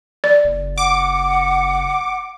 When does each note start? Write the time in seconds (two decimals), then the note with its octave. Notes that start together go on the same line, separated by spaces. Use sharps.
0.24 D5
0.44 F#1
0.78 F#5 D6